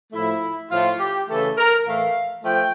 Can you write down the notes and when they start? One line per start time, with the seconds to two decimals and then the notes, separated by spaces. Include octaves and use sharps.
0.12 A2 F3 A3 E4
0.70 A2 F3 A3 F4
0.99 G4
1.28 C#3 E3 A3 A4
1.56 A#4
1.85 A2 E3 A3 F5
2.43 F3 A3 G5